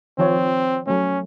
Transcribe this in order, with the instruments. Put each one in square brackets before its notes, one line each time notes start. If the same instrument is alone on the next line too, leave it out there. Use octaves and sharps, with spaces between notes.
[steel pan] D#3 F3 C#5 [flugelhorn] C4
[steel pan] F#3 A3 [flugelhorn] C#4